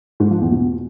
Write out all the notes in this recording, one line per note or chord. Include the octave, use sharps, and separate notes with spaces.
G#2
F3
E2
B2